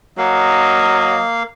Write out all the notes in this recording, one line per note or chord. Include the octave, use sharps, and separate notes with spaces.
F#3 A#3 D#5 F5